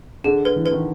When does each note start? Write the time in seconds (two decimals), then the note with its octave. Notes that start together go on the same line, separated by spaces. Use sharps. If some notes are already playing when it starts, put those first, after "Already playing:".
0.24 D3 G#4
0.45 B4
0.56 E3
0.66 B4
0.71 D#3